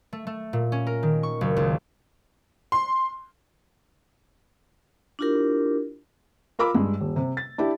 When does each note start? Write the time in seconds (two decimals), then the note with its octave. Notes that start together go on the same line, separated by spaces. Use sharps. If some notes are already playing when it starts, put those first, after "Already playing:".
0.13 A3
0.27 A3
0.53 A#2
0.72 C#4
0.87 A#4
1.03 D#3
1.23 C#6
1.41 F#1
1.57 C#2
2.72 C6
5.19 D4 E4 F4 G4 A#4
6.59 F4 A#4 B5 D6 E6
6.74 G2 G#3
7.01 D#1
7.16 C3
7.37 A6
7.58 D4 E4 G4